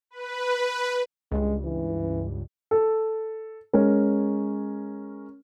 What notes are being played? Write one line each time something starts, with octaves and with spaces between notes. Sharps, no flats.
B4
C#2 G2 G#3
E3
A4
G#3 C#4 A#4